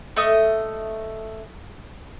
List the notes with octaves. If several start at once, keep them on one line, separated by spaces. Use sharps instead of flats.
A3 D#5 D#6